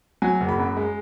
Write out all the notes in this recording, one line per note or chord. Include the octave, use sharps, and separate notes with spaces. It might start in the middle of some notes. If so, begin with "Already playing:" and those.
F#3 G#5
F#1
B5
F#2
G#3